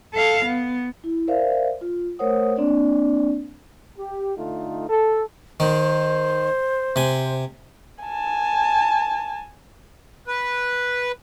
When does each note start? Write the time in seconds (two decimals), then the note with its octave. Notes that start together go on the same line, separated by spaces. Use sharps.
0.14 A4 F5
0.45 B3
1.04 E4
1.28 A#4 C5 D5 E5 F5
1.81 F4
2.19 A3 A#4 C5 C#5 F#5 D#6
2.56 A#3 C4 D4 D5
3.98 G4
4.36 D3 A3 D#4 F4
4.89 A4
5.60 D#3 C5
6.96 C3 G#5
8.04 G#5 A5
10.27 B4